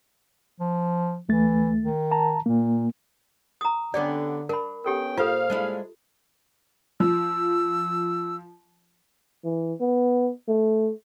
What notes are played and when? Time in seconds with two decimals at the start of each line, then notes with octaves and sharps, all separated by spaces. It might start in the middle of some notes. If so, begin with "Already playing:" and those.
0.60 F3
1.29 D2 E3 A3 A6
1.80 D#3
2.11 A5 A#5
2.46 A#2 A#3
3.61 A#5 D#6
3.94 D3 B3 C#4 G4 D5
4.49 D4 A#4 B5
4.85 B3 C#4 G4 A4 A#4 G5
5.17 A#2 F4 A4 C5 F5
5.50 G#3 D4 E4
7.00 F3 E6
9.44 E3
9.81 B3
10.48 A3